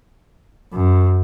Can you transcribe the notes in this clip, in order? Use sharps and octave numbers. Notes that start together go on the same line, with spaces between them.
F#2